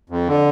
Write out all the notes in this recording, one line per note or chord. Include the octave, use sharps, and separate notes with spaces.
F2
D3